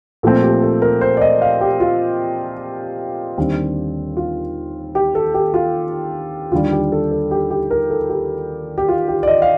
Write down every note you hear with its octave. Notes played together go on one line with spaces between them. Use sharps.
A#2 F3 A3 C4 A4
G4
A4
A#4
C5
D5
D#5
F5
G4
F4
D#2 D3 G3 C4
F4
G4
A4
G4
F4
D#2 D3 G3 F4
G4
A4
A4
G4
G4
A#4
A4
G4
G4
F4
G4
D5
D#5
F5